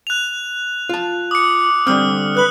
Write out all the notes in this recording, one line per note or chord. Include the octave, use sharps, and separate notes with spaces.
F#6 F7
F4 A5
D6 D#6 C#7
D3 G3 C4 D#6 F6
B4 F6 F#6 F#7